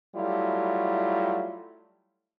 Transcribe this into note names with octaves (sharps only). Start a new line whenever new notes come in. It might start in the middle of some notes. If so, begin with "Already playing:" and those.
F#3 G3 A3 E4 F4